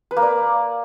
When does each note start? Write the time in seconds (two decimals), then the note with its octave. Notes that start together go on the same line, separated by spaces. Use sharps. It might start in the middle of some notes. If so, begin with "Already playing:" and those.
0.11 B4
0.17 A#3
0.22 D5